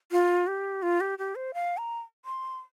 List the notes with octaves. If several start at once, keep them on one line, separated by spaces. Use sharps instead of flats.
F4
G4
F4
G4
G4
C5
F5
A#5
C6